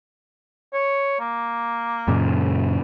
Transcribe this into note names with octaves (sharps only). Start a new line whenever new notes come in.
C#5
A#3
F#2 A#2 C#3